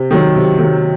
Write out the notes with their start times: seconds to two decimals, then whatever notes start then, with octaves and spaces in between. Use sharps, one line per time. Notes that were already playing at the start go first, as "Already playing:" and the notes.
Already playing: C3
0.11 D#3 F#3
0.36 C3
0.59 D#3 F#3